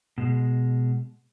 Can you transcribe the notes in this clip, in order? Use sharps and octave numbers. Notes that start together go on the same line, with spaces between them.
B2 G#3